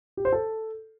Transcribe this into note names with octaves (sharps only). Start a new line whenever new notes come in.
G4
C5
A4